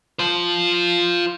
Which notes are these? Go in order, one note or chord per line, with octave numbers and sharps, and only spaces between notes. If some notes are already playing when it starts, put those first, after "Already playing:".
F4 C5